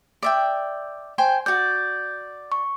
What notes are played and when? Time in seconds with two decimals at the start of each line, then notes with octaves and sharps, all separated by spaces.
0.23 D5 E5 G5
1.18 C5 G5 G#5
1.46 F#4 D5 G6
2.52 C#6